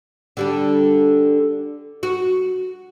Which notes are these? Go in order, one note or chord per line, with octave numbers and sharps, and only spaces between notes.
D3 G3 D4
F#4